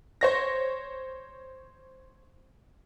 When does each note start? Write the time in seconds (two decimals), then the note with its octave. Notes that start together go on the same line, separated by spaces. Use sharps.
0.21 C5 C#5 A#6